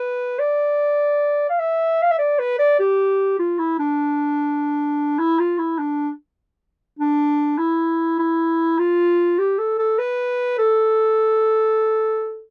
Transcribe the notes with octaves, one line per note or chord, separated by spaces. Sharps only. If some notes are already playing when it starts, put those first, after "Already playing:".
Already playing: B4
D5
F5
E5
F5
E5
D5
B4
D5
G4
F4
E4
D4
E4
F4
E4
D4
D4
E4
E4
F4
G4
A4
A4
B4
A4